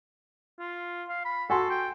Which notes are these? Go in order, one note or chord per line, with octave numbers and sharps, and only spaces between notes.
F4
F5
B5
F#4 A4 G#5 C6
G5